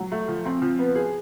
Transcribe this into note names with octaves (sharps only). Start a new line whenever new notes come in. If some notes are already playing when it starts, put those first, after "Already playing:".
Already playing: F#3
A3
F3
C4
F3
B3
G#4